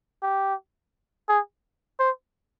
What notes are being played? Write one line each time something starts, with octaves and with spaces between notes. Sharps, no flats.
G4
G#4
C5